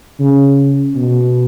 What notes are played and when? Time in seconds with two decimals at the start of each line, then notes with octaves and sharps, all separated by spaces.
0.20 C#3
0.96 B2